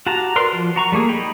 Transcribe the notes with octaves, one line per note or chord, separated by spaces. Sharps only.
F#4 G4 A5 A#5
A#4 B4 D5 C6
F3
F#4 A#5 C#6
G3 A3 A#3 G#4
D#4 G5 B5